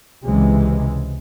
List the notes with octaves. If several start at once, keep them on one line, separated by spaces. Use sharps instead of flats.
C#2 C3 E3 G#3